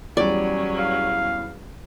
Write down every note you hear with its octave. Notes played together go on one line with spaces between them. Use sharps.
E2 F#3 G3 C#4 D5
F5